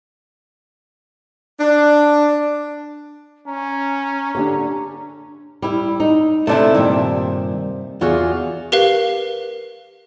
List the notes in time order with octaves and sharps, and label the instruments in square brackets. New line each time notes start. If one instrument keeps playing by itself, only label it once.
[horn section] D4
[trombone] C#4 [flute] A#5
[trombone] D3 [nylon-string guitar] D4 G4 C#5
[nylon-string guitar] G3 E4
D#4
[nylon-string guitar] C3 A5 [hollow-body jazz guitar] A3 D4 E4
[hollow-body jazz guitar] G2 A#2 D#3
[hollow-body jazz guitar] E2 [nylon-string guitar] F4 F#4 G#4
[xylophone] G4 A#4 B4 F5